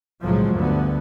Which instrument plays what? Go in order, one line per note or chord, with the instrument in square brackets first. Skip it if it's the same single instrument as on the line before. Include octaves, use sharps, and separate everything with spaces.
[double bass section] B1 A2 C#3 F3 F#3 G#3
D2 G2 D3 B3